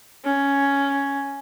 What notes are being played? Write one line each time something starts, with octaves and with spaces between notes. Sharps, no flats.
C#4